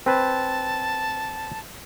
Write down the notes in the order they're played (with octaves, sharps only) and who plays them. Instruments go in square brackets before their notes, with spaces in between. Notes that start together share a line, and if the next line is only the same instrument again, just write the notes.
[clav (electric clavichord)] C4 B4 [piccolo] A5